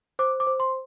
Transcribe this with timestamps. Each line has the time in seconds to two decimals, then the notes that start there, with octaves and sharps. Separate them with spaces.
0.19 C5 D6
0.40 D6
0.47 C5
0.60 C6